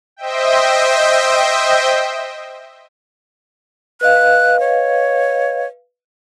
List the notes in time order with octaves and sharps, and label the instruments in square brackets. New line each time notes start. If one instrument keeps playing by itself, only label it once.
[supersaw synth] C5 D#5 E5 G5
[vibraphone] B4 D#5 F5 [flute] F#6
[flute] C#5